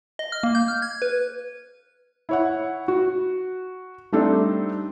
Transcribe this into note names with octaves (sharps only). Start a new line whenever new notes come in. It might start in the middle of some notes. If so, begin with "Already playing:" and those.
D#5
F6
A#3
G6
F6
G#6
B4
E4 C#5 F#5
F#4
G3 A3 C4 D4 D#4 A4